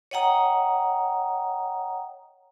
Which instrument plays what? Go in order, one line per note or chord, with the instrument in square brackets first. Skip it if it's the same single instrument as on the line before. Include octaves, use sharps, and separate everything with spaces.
[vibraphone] C#5 D#5 F#5 G5 A#5 D#6